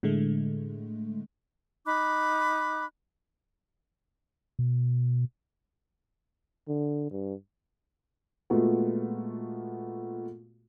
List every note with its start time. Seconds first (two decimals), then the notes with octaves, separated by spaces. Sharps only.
0.03 A2 D3 G#3 A3
1.86 D#4 B5 D6 F#6
4.59 B2
6.68 D3
7.11 G2
8.50 A#2 G#3 A3 B3 F4 F#4